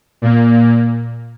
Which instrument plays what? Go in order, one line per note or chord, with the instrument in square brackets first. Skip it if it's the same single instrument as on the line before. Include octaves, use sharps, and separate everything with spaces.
[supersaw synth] A#2 A#3